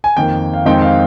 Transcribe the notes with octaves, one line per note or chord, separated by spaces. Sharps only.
G#5
F2 D#3 A#3 G5
F5
F2 D#3 G#3 C4 D#4 G5
F5